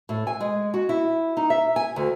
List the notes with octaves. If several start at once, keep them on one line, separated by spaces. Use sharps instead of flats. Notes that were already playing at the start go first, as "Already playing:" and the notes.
A2
G#5
G#3
F#4
E4
D#4
E5
G#5
D2